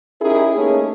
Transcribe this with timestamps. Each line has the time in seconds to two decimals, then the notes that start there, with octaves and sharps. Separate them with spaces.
0.21 C#4 D#4 E4 G4 G#4 A#4
0.56 A3 A#3 C#4 D#4 A4